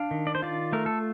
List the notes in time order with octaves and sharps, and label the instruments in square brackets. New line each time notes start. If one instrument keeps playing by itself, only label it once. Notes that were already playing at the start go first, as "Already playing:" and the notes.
Already playing: [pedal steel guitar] D4 F5
D#3
D5
C5
F4 D5
A3 A#4
A4